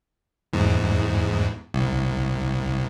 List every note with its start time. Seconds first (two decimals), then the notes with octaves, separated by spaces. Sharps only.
0.53 E2 G#2
1.74 C2